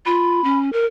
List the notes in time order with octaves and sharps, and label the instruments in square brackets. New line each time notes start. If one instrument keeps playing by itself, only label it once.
[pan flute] F4 [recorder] B5
[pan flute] C#4
A#4